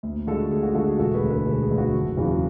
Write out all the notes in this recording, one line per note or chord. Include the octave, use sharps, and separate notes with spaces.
D2
D3 G#3 F#4 A4
D2 G#4
F#4
D3 G#3 F#4 A4
G#4
E1 F#4 A4
G#4 B4
D2 D3
G#4 B4
E1 G#4 B4
G#4
D2 D3
F#4
F#1
E2 C#3 F#3